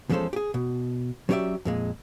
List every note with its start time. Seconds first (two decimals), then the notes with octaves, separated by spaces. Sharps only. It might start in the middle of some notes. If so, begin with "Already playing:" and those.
0.09 E2 F3 G#3 C#4 A4 C5
0.33 G4 G#4
0.54 B2
1.29 F#3 C#4 G4 C5 D5 E5
1.65 F2 A#2 G#3